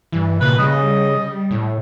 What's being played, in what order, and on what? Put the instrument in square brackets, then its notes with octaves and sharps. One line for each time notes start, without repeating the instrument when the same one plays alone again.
[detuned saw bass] G2 [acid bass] E3
[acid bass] A#2 [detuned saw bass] C#3 [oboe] B4
[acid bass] C#3 [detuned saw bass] G3 [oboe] D#5
[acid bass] A2